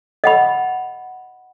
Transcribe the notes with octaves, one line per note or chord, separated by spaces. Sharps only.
D#5 F#5 B5